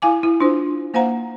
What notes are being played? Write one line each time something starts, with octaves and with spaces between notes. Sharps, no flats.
E4 F5 G#5 D6
E4
D4 E4 F4 C5
A#3 C5 F5 F#5 A#5